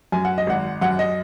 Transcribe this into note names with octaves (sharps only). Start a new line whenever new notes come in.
F#2 G#5
F#5
D#5
G#1 F#5
F#2 F#5
D#5